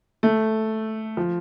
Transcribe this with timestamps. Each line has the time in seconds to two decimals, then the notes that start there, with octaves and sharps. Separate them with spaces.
0.23 A3
1.17 F3